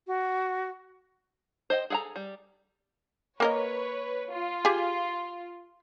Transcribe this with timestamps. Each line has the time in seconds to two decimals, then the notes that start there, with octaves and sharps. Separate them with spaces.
0.07 F#4
1.70 C5 D#5 G5
1.90 G#4 A4 F#5 G#5 A#5
2.16 G3
3.40 A#3 A#4 B4 C#5 D#5
4.32 F4
4.65 G4 G#4